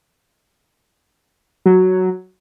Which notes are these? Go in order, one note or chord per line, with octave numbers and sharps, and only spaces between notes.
F#3